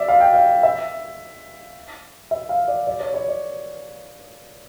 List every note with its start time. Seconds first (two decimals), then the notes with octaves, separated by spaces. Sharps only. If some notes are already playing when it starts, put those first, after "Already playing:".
Already playing: D5 E5
0.08 F5
0.20 G5
0.34 F5
0.63 E5
2.31 E5
2.49 F5
2.68 D5
2.87 D5
3.00 C#5
3.14 C#5
3.28 D5